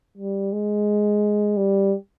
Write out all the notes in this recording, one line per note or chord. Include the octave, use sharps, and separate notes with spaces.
G3
G#3
G3